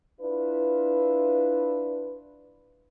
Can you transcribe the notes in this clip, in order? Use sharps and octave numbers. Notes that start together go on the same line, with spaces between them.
D4 E4 F4 B4